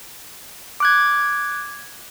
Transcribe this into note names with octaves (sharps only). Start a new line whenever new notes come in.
D6 F#6 G#6